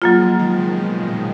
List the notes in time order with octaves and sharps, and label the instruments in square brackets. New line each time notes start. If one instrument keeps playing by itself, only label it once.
[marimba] F#3 A#3 F4 [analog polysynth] G#3
[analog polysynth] F3
D#3
C#3
B2
A#2